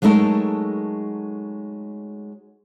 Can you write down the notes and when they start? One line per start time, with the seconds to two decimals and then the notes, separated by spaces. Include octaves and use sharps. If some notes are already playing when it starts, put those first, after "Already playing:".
0.02 F#3 G#3 A3 D#4 A4 A#4